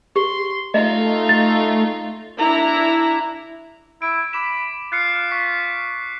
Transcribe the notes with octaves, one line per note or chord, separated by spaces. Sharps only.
G4 C6
A3 D#4 F4 D#5 E5
A6
D4 E4 A#5
E4 D7
B5 D6 E7
F4 F#6 C7 C#7
C#6 B6